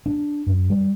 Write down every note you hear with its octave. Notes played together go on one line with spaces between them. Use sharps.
D4
F#2
G3